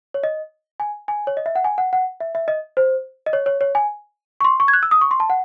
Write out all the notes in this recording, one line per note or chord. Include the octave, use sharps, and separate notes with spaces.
C#5
D#5
G#5
G#5
C#5
D#5
E5
F#5
G#5
F#5
F#5
E5
E5
D#5
C5
D#5
C#5
C#5
C#5
G#5
C#6
C6
C#6
G#6
F#6
E6
D#6
C#6
C6
A5
F#5